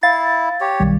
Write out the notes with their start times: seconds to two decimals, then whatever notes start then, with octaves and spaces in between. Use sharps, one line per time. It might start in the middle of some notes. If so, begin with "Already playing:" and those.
0.03 E4 F5 A6
0.61 G4 C#5
0.80 B1 D#3 G3